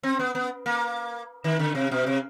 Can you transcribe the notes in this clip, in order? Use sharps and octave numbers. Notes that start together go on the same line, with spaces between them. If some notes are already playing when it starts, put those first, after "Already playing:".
C4
B3
B3
A#3
D#3
D3
C3
B2
C3